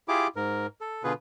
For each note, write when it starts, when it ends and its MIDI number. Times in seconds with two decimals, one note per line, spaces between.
0.08 0.27 64
0.08 0.27 65
0.08 0.27 67
0.08 0.27 68
0.08 0.27 86
0.36 0.66 44
0.36 0.66 70
0.81 1.03 69
1.04 1.13 47
1.04 1.13 50
1.04 1.13 65
1.04 1.13 68
1.04 1.13 71